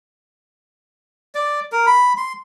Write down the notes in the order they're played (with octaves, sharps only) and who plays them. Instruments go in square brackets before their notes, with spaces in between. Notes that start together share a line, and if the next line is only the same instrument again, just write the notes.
[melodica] D5
A#4
B5
C6